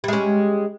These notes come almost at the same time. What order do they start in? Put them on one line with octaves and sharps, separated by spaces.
G3 G#3 C#4